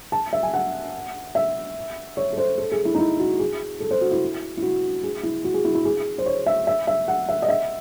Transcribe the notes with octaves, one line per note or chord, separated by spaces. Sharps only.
A5
E5
G#5
F#5
E5
C#5
A4
C5
A4
G#4
E4
D#4
E4
F#4
G#4
A4
C5
F#4
E4
E4
F#4
G#4
E4
F#4
G#4
E4
E4
G#4
C5
C#5
E5
E5
E5
F#5
E5
D#5
E5